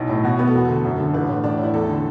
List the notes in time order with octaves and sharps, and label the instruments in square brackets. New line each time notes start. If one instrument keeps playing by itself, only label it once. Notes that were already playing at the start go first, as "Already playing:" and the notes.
Already playing: [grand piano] B1 [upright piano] E4
[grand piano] A2
[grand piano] B2 [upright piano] F#4
[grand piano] B3 [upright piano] B4
[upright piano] A4
[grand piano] E1 [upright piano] F#4
[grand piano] D2 [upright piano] A4
[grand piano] F#2
D3
[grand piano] A1 [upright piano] B4
[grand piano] A2
[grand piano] A1 [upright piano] D4
[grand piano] A2 [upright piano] E4
[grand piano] E2 [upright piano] A4
[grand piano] D3